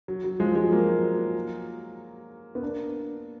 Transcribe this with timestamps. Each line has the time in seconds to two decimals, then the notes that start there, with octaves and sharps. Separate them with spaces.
0.08 F#3
0.24 F#3
0.40 F3 G#3
0.55 F3 G#3
0.71 F#3 A#3
2.55 B3
2.63 A#3 D4